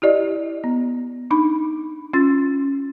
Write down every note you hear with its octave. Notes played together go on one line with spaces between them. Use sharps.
E4 G4 D5 D#5
B3
D4 D#4 B5
C#4 F4 A6